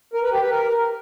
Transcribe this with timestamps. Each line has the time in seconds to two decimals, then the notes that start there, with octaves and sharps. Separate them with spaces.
0.14 A#4
0.23 B4
0.32 G4
0.42 B4
0.51 A#4